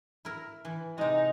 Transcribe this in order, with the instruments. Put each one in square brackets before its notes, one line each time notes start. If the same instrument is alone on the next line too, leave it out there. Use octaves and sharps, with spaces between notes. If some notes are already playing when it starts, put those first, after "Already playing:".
[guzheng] E4 A#4
E3
[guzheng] C3 G#3 [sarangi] D#4